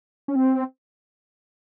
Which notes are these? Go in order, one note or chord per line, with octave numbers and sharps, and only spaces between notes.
C#4
C4